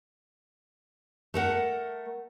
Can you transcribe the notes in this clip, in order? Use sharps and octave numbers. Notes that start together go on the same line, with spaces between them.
A3 A#4 F#5